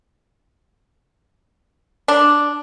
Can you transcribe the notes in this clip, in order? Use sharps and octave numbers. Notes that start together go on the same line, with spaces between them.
D4